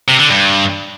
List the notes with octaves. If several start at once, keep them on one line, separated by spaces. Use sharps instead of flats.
C3
D3
G2